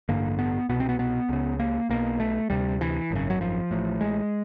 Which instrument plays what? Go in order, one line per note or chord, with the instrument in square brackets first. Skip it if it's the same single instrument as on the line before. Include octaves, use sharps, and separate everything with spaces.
[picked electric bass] A1 G2 D3 A#3
B3
C2 B2 B3
C4
B3
B3
C#2 C#3
A#3
B1 B2 A#3
A3
D2 C3 G3
E3
G#1 F#2 C#3
F#3
F3
A1 A2
G#3